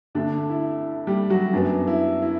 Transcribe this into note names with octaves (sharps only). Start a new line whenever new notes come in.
D2 D3 A3 D4
E4
G3 G4
F#3 F#4
F#2 F#3 B3 D4
E4
E4